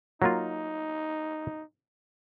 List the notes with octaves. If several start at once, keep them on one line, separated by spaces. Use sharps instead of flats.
F#3 A#3 D#4 F4